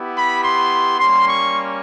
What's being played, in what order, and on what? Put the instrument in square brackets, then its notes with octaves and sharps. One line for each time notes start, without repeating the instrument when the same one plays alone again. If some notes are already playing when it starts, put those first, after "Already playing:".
Already playing: [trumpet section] B3 E4 G4
B5
C6
G3 A#3 C#4 C6
C#6